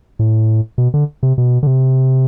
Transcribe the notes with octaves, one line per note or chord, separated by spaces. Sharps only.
A2
B2
D3
C3
B2
D3
C3